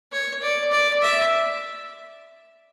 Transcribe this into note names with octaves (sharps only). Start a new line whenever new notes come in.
C#5
D5
D5
E5